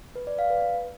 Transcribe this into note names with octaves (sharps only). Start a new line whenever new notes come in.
B4
D5
F5
B4